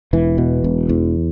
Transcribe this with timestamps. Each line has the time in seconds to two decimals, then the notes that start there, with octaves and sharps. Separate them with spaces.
0.13 E1 E3
0.38 B2
0.64 E1
0.89 E2